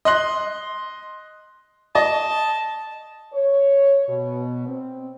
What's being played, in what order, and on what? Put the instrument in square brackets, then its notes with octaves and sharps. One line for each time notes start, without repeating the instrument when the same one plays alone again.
[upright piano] D#5 C6 F#6
[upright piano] D#5 [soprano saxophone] A5
[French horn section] C#5
B2
C4